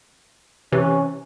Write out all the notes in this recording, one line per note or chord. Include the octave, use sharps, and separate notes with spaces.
C3 E3 C#4